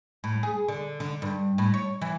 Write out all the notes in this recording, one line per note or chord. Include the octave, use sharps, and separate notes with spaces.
A2
G#4
D3
D3
G2
A2
C#5
E3